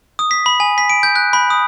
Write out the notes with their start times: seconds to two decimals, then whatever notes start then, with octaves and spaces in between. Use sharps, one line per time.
0.19 D#6
0.31 B6
0.46 B5
0.60 G#5
0.78 B6
0.90 D7
1.03 G6
1.15 F#6
1.33 B5
1.50 D#6